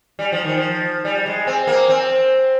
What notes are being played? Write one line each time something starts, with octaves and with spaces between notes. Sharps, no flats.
G3
F3
D#3
F3
G3
G#3
C4
A#3
C4